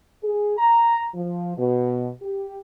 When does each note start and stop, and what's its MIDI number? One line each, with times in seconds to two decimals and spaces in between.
0.23 0.57 68
0.57 1.06 82
1.14 1.54 53
1.57 2.08 47
2.22 2.60 67